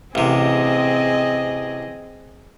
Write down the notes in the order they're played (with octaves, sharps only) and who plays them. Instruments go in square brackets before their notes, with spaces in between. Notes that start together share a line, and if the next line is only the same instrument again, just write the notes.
[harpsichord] A1 C3 [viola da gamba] C4 G#4 D#5